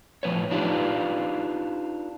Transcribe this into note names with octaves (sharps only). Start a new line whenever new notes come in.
A2 F3 F#3 B4 C#5
D4 D#4 F4 G4 B4